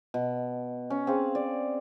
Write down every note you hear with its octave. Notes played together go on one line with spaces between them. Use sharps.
B2
C#4
C4 G#4 F5
D5